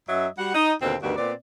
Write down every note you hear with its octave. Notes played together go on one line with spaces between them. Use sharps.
F#2 F#3 D#5 E5
G3 F#4 F#5
D#4
D#2 B2 D3 C4
D2 G2 D#3 B3 F#4
A#2 B3 C4 D5